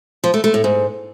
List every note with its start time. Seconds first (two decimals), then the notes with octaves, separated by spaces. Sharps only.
0.24 F3
0.34 A3
0.44 A3
0.54 A2
0.64 G#2